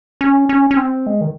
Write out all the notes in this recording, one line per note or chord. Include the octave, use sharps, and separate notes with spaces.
C#4
C#4
C#4
C4
G#3
D#3